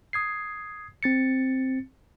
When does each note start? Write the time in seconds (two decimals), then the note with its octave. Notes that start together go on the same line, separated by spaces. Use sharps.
0.13 D#6 G#6 C7
1.03 C4 A6 C#7